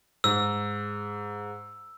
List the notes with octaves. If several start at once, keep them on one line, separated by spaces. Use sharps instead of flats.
G#2 E6